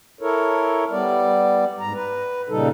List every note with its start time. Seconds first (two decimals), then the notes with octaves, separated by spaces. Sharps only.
0.21 E4 A4 A#4 C#5
0.91 G3 B3 D5
1.80 G#2 A#5
1.93 B4
2.49 A#2 C#3 G3 D#4 A4